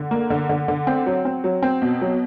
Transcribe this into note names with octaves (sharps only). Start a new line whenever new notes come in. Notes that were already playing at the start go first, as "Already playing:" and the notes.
Already playing: D3
A#3
D3
D3
D3
C4
F#3
C4
F#3
C4
B2
F#3